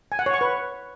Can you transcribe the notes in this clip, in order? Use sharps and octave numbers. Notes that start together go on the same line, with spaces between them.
G#5
F#5
C#5
C#6
B4